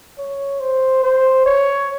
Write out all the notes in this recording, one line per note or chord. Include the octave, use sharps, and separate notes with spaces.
C#5
C5
C5
C#5